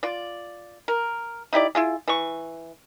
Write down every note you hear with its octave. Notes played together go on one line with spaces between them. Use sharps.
F4 D5
A#4
D#4 E4 G4 D5
E4 F4 G#4
E3 C#6